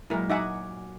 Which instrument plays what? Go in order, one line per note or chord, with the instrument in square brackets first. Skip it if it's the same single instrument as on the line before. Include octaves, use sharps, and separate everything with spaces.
[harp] A#2 F#3 G#3 [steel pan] E4 A#4
[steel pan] D#4 E5 F#5 [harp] F#4 G#5 D6